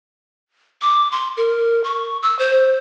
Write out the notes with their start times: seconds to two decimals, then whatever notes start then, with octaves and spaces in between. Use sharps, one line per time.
0.82 D6
1.12 C6
1.37 A#4
1.84 C#6
2.22 E6
2.39 C5